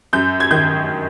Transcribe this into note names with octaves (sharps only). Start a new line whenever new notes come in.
F#2 G6
G#6
D#3 G6